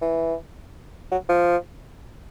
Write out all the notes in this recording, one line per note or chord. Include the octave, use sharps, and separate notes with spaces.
E3
F#3
F3